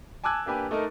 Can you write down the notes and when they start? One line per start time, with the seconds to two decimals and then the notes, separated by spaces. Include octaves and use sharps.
0.24 G#5 A5 D6 E6 F#6 G#6
0.46 A#3 D4 G4 B4 G#5
0.71 A3 D#4 A4 A#4